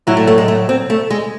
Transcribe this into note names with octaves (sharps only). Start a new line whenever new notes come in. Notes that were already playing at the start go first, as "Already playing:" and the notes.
A2 F#3 E4
A3
A3
G#3
A3
C4
A3
G#3